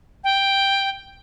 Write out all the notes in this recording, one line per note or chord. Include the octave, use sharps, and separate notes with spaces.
G5